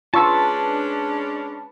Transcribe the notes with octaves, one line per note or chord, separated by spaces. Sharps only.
G#3 C#4 D4 F4 B4 A5 C#6 E6